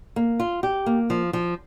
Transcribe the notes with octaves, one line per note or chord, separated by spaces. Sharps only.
A#3
F4
G4
A#3
F3
F3